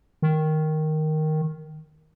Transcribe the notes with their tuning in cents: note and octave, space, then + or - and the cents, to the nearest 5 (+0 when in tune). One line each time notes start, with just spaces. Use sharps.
D#3 +0